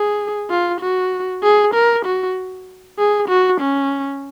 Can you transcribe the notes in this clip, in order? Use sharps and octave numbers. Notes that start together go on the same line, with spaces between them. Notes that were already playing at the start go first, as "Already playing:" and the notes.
Already playing: G#4
F4
F#4
G#4
A#4
F#4
G#4
F#4
C#4